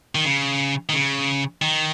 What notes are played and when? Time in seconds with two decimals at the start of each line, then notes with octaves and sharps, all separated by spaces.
0.15 D#3
0.25 C#3
0.89 D#3
0.94 C#3
1.62 D#3